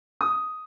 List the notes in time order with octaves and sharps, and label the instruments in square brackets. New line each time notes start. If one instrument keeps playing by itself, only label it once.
[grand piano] D#6